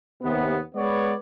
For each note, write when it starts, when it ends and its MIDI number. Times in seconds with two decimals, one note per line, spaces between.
0.21 0.58 39
0.21 0.58 48
0.21 0.58 59
0.74 1.13 56
0.74 1.13 59
0.74 1.13 71
0.74 1.13 73
0.74 1.13 74